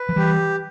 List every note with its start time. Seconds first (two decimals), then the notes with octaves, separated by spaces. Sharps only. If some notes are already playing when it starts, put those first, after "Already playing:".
Already playing: B4
0.09 F3
0.16 E3 G3 G4